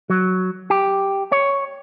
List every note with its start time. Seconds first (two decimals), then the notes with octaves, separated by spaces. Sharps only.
0.10 F#3
0.70 G4
1.32 C#5